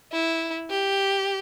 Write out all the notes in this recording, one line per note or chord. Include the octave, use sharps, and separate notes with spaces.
E4
G4